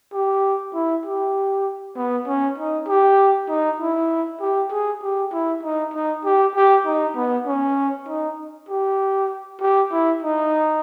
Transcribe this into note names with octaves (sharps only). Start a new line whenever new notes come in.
G4
E4
G4
B3
C#4
D#4
G4
D#4
E4
G4
G#4
G4
E4
D#4
D#4
G4
G4
D#4
B3
C#4
D#4
G4
G4
E4
D#4